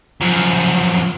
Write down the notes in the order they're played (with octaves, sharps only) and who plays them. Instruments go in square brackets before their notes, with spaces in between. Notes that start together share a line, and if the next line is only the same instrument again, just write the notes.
[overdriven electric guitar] F#2 F3